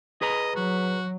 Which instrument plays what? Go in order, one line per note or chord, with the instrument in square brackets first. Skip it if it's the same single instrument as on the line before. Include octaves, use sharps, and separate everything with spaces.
[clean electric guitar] G#4 B4 A#5 [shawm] D#5
[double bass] F#3 [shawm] F#4